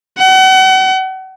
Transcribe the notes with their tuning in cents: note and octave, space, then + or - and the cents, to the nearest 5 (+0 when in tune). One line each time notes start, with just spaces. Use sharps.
F#5 +35